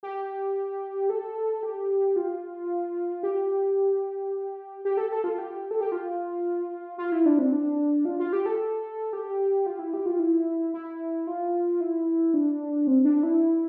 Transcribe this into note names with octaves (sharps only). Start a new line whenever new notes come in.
G4
A4
G4
F4
G4
G4
A4
A4
F4
G4
A4
G4
F4
F4
E4
D4
C4
D4
F4
F4
G4
A4
G4
F4
E4
G4
F4
E4
E4
F4
E4
D4
C4
D4
E4